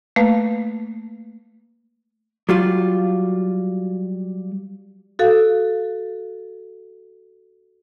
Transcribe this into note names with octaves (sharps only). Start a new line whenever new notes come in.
A3 A#3 B4 F5
F#3 G3 F4
F#4 A4 F5